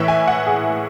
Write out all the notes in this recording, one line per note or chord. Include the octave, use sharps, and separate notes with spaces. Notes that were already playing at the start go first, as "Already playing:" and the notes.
Already playing: A2 E3 E5
G#5
F#5
G#4